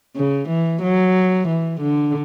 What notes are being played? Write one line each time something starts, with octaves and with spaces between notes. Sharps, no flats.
C#3
E3
F#3
E3
D3